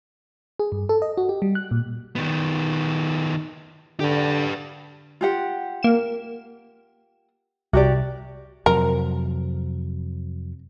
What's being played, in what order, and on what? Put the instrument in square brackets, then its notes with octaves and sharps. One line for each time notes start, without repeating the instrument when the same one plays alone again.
[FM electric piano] G#4
G2
A4
D#5
F#4
G4
G3
F#6
A#2
[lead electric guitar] D#3 B3
[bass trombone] D3 [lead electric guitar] G4 B4
[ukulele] F4 G4 F#5
[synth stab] A#3 E7
[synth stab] C2 [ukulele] F#4 G4 D5
[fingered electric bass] F2 C3 F#3 [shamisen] A#4